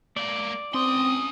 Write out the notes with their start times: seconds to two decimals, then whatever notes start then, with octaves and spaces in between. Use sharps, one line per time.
0.16 A3 A#3 D5
0.74 C4 C#4 C6 D#6